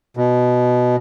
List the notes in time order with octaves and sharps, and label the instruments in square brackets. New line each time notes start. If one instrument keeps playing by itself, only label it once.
[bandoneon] B2